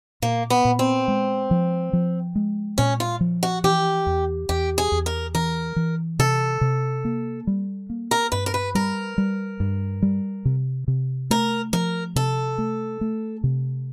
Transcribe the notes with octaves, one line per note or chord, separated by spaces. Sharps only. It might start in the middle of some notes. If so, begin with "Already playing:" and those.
A#2 A#3
B3
A#2
C4
G#3
F3
F3
G#3
A#2 C#4
F4
F3
F#4
E3 G4
E2
E2 G4
G#4
E2
A#4
E3 A#4
E3
C3 A4
C3
A#3
G3
A#3
A#4
G2 B4
A#4
B4
G3 A#4
G3
G2
G3
C3
C3
A3 A#4
F3 A#4
C3 A4
A3
A3
C3